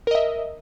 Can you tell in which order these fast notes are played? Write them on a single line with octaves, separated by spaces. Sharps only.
A#4 D#5 E5